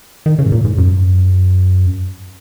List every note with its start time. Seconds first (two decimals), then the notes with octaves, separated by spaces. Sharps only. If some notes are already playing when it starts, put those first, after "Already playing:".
0.26 D#3
0.39 C#3
0.46 G#2
0.52 A#2
0.65 G#2
0.78 F#2